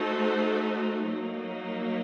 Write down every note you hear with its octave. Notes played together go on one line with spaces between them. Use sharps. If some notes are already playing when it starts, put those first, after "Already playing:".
Already playing: A3 D#4 F#4 A4 C5
F#3 A#3 D#4